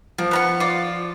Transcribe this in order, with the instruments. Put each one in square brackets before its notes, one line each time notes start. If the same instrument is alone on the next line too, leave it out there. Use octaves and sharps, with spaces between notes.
[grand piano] F3 [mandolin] A#3
[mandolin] B3 A#5 C#6
F4 D5